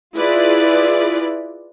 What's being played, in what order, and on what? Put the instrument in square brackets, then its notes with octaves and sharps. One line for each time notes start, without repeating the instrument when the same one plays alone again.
[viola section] E4 F4 G#4 B4 D5